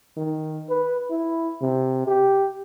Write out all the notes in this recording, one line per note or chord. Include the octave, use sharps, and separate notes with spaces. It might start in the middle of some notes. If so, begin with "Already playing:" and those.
D#3
B4
E4
C3
G4